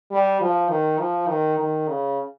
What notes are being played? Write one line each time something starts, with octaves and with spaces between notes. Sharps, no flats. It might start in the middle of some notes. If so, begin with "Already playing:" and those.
G3
F3
D#3
F3
D#3
D#3
C#3